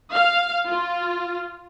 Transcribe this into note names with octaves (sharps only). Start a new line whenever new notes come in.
F5
F4